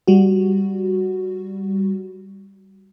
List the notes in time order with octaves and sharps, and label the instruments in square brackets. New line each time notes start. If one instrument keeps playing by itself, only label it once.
[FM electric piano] G3 F#4